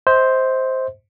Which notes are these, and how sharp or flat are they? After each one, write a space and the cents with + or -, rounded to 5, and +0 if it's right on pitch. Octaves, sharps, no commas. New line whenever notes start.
C5 +0 D#5 +45